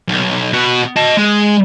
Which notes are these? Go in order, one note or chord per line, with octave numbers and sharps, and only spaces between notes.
B1
B2 F#4
D#5 A5
G#3